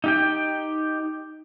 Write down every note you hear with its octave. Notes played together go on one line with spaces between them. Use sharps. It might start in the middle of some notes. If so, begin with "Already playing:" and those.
D#4 G4 G5